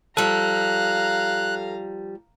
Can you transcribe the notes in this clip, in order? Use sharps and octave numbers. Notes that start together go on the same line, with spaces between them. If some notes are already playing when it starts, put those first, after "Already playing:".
F3 G3 A4 F5 A#5 F#6